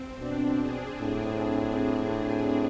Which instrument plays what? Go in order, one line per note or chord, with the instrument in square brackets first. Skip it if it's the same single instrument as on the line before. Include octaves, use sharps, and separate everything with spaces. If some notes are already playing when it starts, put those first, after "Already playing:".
Already playing: [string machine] C4
[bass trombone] B2 [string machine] D4
[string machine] G#4
[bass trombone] A2